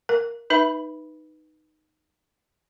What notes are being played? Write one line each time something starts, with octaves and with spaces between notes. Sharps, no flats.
A#4
D#4 B4 E5 B5